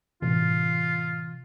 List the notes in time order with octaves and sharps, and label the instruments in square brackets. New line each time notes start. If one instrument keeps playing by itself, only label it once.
[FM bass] A2 [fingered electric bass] C3 E3 [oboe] F4